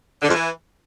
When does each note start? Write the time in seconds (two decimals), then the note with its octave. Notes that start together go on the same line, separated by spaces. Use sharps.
0.22 D3
0.28 F2
0.34 E3